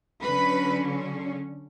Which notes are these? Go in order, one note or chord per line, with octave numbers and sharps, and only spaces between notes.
D3 F#3 C#4 B4